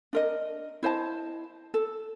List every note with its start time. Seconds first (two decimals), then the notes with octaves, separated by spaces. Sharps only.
0.13 D4 A#4 D#5
0.83 E4 C5 D#5 A5
1.74 A4